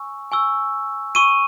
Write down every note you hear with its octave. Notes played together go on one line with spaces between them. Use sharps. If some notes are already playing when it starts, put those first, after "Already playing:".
Already playing: G#5 C#6 E6
G#5 C#6 E6
G#5 C#6 E6 D#7